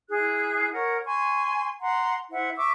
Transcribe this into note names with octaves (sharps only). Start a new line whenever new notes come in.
E4 G#4 F#6
A#4 C#5 F#5
G#5 C6 C#6
F#5 A#5 C6
E4 C5 E5 F#5
E5 C#6 D6 E6